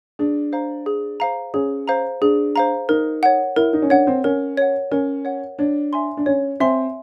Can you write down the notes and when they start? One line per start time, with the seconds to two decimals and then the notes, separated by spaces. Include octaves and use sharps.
0.19 D4 G#4
0.53 C5 F5 A#5
0.86 G#4
1.20 C5 F5 A#5
1.54 C#4 G#4
1.88 C5 F5 A#5
2.21 D4 G#4
2.56 C5 F5 A#5
2.89 D#4 A#4
3.23 C#5 F#5
3.56 E4 A#4
3.73 D#4
3.82 C#4
3.90 D4 C#5 F#5
4.07 C4
4.24 C#4 A#4
4.57 C#5 F#5
4.91 C#4 A#4
5.25 C#5 F#5
5.59 D4 C#5
5.93 E5 G#5 C6
6.17 D4
6.26 C#4 C#5
6.60 C4 E5 G#5 C6